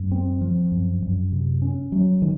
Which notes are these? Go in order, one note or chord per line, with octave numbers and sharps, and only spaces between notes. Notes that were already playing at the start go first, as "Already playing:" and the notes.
Already playing: F#2
C4
F3
F#2
F#2
C3
C#4
F#3
D#3